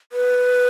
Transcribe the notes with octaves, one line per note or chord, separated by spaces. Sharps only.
B4